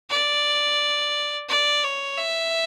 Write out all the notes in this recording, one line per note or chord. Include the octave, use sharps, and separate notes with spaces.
D5
D5
C#5
E5